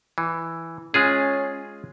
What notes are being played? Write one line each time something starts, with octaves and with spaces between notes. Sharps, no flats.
E3
G#3 C#4 F4 G#4